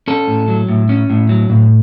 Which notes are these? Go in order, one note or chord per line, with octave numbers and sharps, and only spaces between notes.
C#4 A4
A2
F#3
A2
C#4
A2
F#3
A2